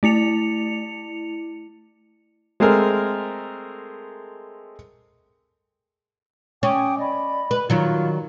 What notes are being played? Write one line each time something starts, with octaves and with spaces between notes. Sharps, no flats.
A3 E4 C#7 F7
G#3 A3 C4 G#4 A#4
C#4 G5 D6 D#6
D5 D#5 B5
B4
D#3 F#3 F4